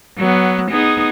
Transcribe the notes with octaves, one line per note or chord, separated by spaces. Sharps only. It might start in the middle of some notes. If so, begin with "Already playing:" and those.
F#3 B3
B3 D#4 G#4